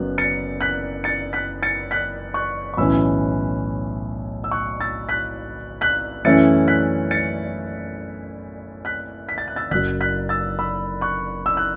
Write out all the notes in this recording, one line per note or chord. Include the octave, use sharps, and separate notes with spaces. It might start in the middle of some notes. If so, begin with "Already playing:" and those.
Already playing: F#1 F#2 F#3 B3 F#6
A6 C#7
F#6 B6
A6 C#7
F#6 B6
A6 C#7
F#6 B6
C#6 F#6
C#6
B1 A2 E3 C#4 E4 B5 E6
E6
C#6 F#6
E6 A6
F#6 B6
F#6 B6
F#2 E3 A3 C#4 E4 A6 C#7
F#6 B6
A6 C#7
F#6 B6
B6
A6
F#6
E6 A6
F#1 F#2 F#3 F#6 B6
F#6 B6
E6 A6
B5 E6
C#6 F#6
E6
F#6